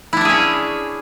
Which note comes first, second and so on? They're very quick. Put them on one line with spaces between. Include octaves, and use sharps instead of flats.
E4 D4 E5 G#4 C#4